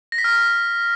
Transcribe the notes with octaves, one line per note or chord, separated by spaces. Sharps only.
A#6
B6
F6